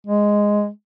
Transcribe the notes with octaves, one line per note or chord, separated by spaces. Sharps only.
G#3